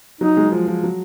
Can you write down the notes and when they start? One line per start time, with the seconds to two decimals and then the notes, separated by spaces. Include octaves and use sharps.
0.21 F#3 D#4
0.37 G#3
0.52 F3
0.67 F3
0.83 F#3